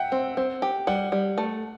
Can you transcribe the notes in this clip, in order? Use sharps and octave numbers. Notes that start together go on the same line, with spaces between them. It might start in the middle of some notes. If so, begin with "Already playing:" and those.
Already playing: E5 F#5 G5
C4
C4
G4
G3 F#5
G3
A3